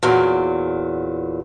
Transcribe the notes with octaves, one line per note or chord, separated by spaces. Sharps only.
E2 A#2 F#3